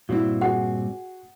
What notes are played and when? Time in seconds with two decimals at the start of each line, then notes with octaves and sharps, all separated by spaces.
0.09 G2 A#2 C4 E4 F#4
0.41 F#4 G#4 F#5